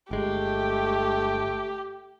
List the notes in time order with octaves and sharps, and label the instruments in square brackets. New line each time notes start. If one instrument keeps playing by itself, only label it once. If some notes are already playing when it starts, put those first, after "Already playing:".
[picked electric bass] G1 G#3 [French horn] A3 [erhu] G4